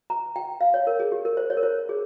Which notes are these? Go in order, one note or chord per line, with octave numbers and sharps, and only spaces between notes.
A#5
G5
F5
C#5
A#4
G#4
G4
A#4
C5
C#5
A#4
C5
G#4